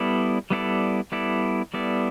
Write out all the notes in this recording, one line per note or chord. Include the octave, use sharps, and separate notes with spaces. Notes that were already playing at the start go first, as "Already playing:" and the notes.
Already playing: G3 B3 E4 A4 D5
G3 B3 E4 A4 D5
G3 B3 E4 A4 D5
G3 B3 E4 A4 D5